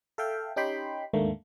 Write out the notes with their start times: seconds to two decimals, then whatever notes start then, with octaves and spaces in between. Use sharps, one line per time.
0.18 A4 E5 F5 G5
0.56 C#4 D#4 G4 G5 B5 C6
1.13 D#2 G#2 D3 A3 A#3